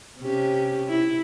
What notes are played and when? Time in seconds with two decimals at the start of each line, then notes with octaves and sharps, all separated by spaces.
0.19 C3 C#4 G4
0.89 E4